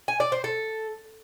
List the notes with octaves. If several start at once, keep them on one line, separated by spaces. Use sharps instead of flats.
G#5
D5
C5
A4